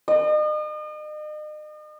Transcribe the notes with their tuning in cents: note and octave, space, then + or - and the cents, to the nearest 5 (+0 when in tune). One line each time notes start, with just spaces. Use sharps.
D#5 -40